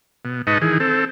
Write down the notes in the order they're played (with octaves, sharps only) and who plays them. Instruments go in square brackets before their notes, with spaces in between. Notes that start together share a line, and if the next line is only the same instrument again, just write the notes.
[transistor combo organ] B2
G#2 D#4 B4 D#5 A5 C#6
D#3 E3 G#4
C4 A4